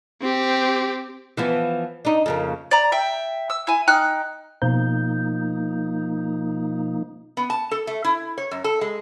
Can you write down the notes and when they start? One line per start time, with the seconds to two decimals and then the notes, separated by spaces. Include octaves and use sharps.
0.22 C4 G4
1.37 E3 F3 B3
2.05 D4 D#4
2.26 F2 C#3 A#3
2.71 D5 A#5
2.92 E5 G5
3.50 E6
3.67 E4 G#5
3.88 D#4 G5 F6 F#6
4.62 B2 F3 A#3 D#4 G6
7.37 B3
7.50 A5
7.71 A4
7.87 A3
8.04 E4
8.38 C#5
8.51 F#2
8.64 A4
8.81 G#3